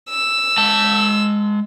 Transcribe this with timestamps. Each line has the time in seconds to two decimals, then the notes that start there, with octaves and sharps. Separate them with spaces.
0.10 E6
0.58 G#3 A5